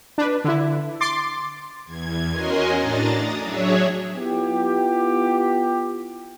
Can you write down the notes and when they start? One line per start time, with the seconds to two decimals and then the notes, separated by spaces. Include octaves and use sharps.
0.18 D4 B4
0.44 D3 E4
1.00 C6 D6 A6 C7
1.85 E2 G#6
2.31 C#4 F#4 A#4 D#5 G#5 C6
2.78 A2 D4 A#5 A6
3.12 D#6
3.42 F#3 D4 G#4 C#5 E5
4.16 B3 E4 F4 G4